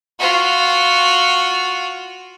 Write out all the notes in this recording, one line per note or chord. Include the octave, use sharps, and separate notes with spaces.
F4 F#4